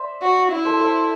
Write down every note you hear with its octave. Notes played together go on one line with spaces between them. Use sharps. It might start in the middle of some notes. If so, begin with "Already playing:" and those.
Already playing: C5 D5 E5
F#4
E4
A4 C5
A4 C5